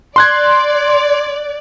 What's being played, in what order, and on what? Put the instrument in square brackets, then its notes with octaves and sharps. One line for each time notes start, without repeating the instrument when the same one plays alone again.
[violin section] D5 [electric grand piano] C6 F#6 G#6